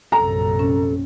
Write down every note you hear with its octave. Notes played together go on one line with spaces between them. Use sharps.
A#1 F#2 C3 A4 A#5
C#4